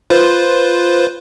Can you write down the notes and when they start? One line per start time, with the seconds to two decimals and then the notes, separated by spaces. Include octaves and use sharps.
0.10 F4 B4 C5